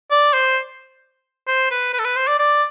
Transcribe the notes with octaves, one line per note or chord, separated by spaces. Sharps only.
D5
C5
C5
B4
B4
A4
B4
C5
D5
D5